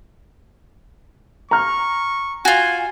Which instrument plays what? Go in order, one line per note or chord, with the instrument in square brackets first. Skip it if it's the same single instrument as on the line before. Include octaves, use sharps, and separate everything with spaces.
[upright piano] A#5 F6 [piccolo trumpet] C#6
[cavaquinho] F4 F#4 [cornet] G#5